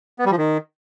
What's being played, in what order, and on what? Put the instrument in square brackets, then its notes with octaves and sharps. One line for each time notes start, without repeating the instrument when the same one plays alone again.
[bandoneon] B3
G3
F3
D#3